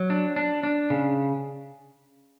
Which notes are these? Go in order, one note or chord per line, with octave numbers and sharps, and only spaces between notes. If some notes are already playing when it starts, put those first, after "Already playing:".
Already playing: F#3
D4
D4
D4
C#3